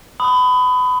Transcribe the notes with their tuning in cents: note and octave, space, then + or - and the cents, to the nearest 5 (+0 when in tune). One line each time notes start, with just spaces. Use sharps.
B5 +25 D#6 +0